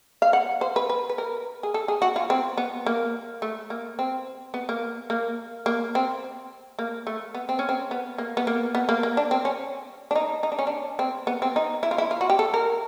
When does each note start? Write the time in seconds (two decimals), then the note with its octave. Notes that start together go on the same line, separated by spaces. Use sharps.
0.22 F5
0.33 F#5
0.61 C5
0.76 B4
0.90 B4
1.09 B4
1.18 A#4
1.63 G#4
1.74 A4
1.88 G#4
2.02 F#4
2.16 F4
2.30 C4
2.58 B3
2.86 A#3
3.42 A3
3.70 A#3
3.99 C4
4.54 B3
4.69 A#3
5.10 A#3
5.66 A#3
5.95 C4
6.79 A#3
7.07 A3
7.35 B3
7.49 C4
7.59 C#4
7.69 C4
7.91 B3
8.18 A#3
8.37 B3
8.47 A#3
8.75 B3
8.89 A#3
9.03 A#3
9.17 D4
9.31 C4
9.45 C#4
10.11 D4
10.15 D#4
10.43 D#4
10.52 D4
10.59 C#4
10.67 D4
10.99 C4
11.27 B3
11.42 C4
11.56 D#4
11.83 E4
11.91 F4
11.98 E4
12.11 F4
12.21 F#4
12.30 G4
12.39 A4
12.54 A#4